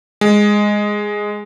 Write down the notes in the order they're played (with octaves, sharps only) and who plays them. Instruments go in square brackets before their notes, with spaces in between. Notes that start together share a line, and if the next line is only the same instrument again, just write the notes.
[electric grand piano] G#3